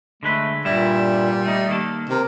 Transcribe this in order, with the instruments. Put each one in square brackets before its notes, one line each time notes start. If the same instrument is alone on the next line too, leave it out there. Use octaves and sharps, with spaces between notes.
[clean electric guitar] D3 G#3 B4 [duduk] A3
[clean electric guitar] G2 E4 E5 [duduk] A#2 [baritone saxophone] G3
[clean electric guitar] A3 D#4
D#3 A#3 A4
[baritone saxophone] C3 [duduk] A#4